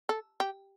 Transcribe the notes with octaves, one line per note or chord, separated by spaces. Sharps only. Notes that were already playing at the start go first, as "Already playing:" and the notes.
A4
G4